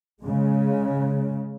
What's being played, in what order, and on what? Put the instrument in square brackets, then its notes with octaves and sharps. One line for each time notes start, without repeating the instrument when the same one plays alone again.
[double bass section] C#3 G#3